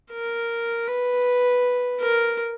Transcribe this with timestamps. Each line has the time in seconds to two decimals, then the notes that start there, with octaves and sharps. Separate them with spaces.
0.11 A#4
0.87 B4
2.00 A#4